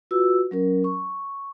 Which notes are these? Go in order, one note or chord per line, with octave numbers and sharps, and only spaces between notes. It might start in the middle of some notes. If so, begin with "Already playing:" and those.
F4 F#4 B4 E6
F#3 C#4 A#4
C#6